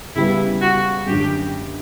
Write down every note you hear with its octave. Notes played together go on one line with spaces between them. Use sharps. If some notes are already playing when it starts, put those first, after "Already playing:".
C#3 G3 B3 E4
F#4
F#2 D3 F#3 G4